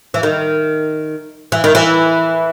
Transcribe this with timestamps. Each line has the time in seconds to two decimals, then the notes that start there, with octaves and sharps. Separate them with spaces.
0.14 E3
0.23 D#3
1.52 E3
1.64 D#3
1.75 E3